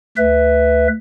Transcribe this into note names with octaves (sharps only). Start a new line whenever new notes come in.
D2 B4 E5